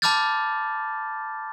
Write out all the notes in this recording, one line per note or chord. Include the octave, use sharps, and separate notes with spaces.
A5 B5 D6 F6 G6 A6